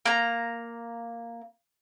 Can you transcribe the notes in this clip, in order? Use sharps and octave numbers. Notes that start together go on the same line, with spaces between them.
A#3 A#5